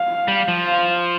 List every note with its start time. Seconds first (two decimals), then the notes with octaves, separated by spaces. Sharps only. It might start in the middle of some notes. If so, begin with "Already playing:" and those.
Already playing: F5
0.28 G3
0.48 F3
0.67 F5